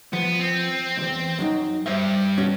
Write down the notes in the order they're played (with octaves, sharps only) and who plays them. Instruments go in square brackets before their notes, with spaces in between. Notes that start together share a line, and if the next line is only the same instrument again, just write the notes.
[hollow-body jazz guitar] F3 [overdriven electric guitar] B3
[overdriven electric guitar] C4
[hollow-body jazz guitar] B1 E2
F#2 F#3 D#4
[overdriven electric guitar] G2 [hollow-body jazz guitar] C5 E5
[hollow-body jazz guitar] B2 C#4 F#4